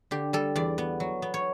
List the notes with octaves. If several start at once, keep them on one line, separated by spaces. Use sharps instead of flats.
D3 G4
G3 A4
E2 D5
B3
F#3
B3
C#5